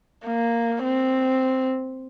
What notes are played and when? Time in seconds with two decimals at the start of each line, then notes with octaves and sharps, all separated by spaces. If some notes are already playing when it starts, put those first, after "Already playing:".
0.26 A#3
0.84 C4